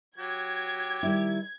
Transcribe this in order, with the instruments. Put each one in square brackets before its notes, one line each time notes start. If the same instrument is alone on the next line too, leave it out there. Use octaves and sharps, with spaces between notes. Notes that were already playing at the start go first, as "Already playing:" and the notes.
[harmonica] F#3 G4 [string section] G#6
[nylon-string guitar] D#3 G3 E4